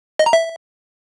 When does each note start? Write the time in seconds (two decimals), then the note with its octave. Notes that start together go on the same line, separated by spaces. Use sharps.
0.19 D#5
0.26 A#5
0.33 E5